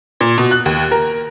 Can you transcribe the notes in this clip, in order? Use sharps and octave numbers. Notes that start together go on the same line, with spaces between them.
A#2
B2
F#6
D#2
A#4